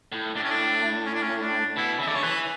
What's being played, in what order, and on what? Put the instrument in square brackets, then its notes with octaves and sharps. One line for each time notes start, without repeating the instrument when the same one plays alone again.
[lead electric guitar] A2
[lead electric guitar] A2 [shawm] D4
[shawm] C#4
D4
C#4
D4
C#4
D4
[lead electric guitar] B2 [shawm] E4
[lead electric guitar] C#3 [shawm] E5
[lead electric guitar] D3 [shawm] D5
[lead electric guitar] C#3 [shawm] C#5
[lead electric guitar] E3 [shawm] B4